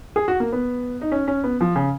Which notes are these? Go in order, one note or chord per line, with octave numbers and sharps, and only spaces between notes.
G#4
F#4
A#3
B3
D#4
C#4
C#4
B3
F3
C#3